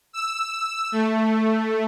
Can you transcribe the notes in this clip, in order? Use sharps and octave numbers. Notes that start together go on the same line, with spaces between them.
E6
A3